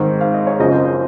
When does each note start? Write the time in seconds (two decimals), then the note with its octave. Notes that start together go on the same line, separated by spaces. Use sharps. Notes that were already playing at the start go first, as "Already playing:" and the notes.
Already playing: G#2 D#3 G#3 C4
0.21 F5
0.34 D#5
0.47 C#5
0.59 F#1 F#2 C#3 F3 C4 D#5
0.72 C5
0.85 C5